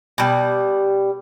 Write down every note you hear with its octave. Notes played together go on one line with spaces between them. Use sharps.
B2 G3